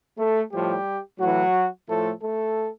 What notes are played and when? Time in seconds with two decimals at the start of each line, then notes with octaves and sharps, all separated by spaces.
0.17 A3 A4
0.51 A2 F3 G3 G4
1.19 A2 E3 F#3 F#4
1.88 A2 F3 A3 A4
2.22 A3 A4